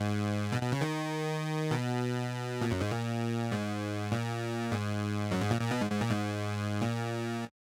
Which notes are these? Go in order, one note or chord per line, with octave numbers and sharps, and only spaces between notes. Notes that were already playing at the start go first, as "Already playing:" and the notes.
Already playing: G#2
B2
B2
C#3
D#3
B2
A#2
F#2
G#2
A#2
G#2
A#2
G#2
F#2
G#2
A#2
A#2
B2
G#2
G#2
A#2
G#2
A#2